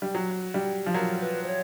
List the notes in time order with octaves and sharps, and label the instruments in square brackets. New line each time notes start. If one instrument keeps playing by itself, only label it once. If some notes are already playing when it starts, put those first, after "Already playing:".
[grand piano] G3
F#3
G3
F3
[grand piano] F#3 [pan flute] A#4
[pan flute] B4
C5
C#5